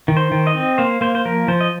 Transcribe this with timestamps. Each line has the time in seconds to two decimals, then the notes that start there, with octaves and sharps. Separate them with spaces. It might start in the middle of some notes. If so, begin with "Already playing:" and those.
0.08 D#3
0.17 C5
0.32 D#3
0.47 D#5
0.55 C4
0.78 A#3 C5
1.01 A#3 C5
1.15 C5
1.25 F3 A#4
1.48 F3 C5
1.61 D#5